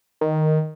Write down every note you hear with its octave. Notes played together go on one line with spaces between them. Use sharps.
D#3